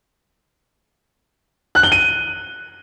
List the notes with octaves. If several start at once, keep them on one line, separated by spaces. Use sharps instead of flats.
F#6
G7
D#7